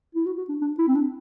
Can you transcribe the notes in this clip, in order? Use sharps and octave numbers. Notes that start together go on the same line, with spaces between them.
E4
F#4
F#4
D4
D4
E4
C4
D4